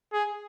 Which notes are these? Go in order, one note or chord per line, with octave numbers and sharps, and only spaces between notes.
G#4